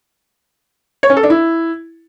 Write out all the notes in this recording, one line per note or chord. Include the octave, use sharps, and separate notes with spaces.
C#5
C#4
A4
D4
E4